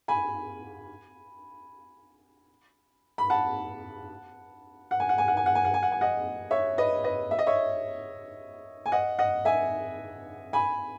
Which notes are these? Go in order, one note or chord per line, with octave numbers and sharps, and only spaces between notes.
G#5 B5
B5
F#5 A5
F#5
G#5
F#5
G#5
F#5
G#5
F#5
G#5
F#5
G#5
F#5
G#5
D#5 F#5
C#5 E5
B4 D#5
B4 D#5
E5
D#5
C#5 E5
G#5
D#5 F#5
D#5 F#5
E5 G#5
G#5 B5